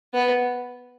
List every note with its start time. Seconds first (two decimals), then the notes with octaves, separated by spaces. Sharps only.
0.14 B3